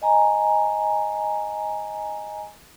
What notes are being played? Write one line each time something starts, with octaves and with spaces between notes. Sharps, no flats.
D#5 G#5 A#5